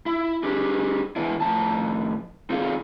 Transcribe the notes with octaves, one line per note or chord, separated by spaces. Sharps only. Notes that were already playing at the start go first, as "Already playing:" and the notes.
E4
D4 G4 G#4
E3 G#3 B3 D4 E4
A2 F3 C4 A5
C4 D#4 F4 G#4 A4